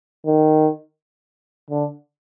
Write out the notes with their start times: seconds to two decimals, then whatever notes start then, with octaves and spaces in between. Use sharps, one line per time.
0.26 D#3
1.70 D3